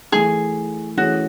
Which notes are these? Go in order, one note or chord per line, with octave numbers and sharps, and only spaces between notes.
E3 A3 E4 G#4
E3 A3 C#4 F#4 G#4